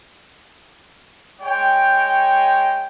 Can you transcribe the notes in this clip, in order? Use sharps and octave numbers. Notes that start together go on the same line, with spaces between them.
G#3 C#5 G5